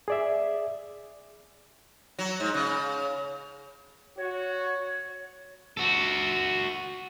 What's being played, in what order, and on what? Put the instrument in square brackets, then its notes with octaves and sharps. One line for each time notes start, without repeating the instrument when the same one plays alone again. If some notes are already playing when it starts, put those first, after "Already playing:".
[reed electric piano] G#4 D5 E5
[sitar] F#3
G#2
C#3
[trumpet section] F#4 [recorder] C#5
[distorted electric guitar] F#4 A4